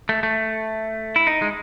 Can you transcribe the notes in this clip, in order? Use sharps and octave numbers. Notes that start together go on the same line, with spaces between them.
A3
A3
E4
D#4
G#3